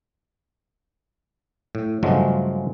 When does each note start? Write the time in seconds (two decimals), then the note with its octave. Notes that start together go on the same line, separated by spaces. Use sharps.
1.75 A2
2.03 G2 C#3 F3 F#3 G#3 A3